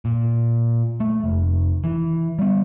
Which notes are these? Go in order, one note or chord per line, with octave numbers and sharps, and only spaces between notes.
A#2
A3
F1
E3
G3 B3